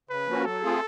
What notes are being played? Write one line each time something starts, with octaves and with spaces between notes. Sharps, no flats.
C#3 B4
F3 A#3 C#4 F#4
F#3 A4
A3 C4 F4 G#4